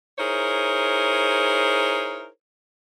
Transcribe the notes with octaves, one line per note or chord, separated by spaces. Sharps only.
D#4 E4 G#4 A#4 C5 C#5